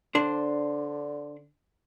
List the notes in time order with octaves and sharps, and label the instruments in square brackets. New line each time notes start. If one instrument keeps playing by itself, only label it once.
[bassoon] D3 [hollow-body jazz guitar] D4 C5